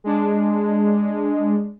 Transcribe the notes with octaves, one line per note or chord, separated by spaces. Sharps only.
G#3 D4